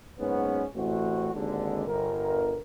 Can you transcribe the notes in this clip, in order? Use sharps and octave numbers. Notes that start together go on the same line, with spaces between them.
F#1 G#2 B3 C#4
A1 A2 C4 F#4
G#1 D#2 G#2 D3
G1 A#4